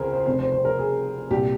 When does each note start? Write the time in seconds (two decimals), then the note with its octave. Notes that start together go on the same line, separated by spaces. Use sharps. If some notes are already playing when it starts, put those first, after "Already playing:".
Already playing: C#2 C#3 G#4 A#4 C5
0.13 C5
0.26 F1 F2 C3 C5
0.39 C5
0.52 C5
0.65 A#4
0.78 G#4
1.30 C2 A#2 G4